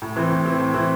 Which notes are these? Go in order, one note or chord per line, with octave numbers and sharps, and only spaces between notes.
A2
E3 C4 E4
A2
E3 C4 E4
A2
E3 C4 E4